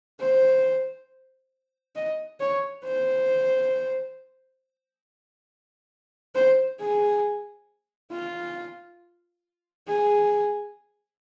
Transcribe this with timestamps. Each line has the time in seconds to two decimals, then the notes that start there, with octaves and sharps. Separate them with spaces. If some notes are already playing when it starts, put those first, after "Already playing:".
0.21 C5
1.95 D#5
2.40 C#5
2.85 C5
6.35 C5
6.80 G#4
8.11 F4
9.88 G#4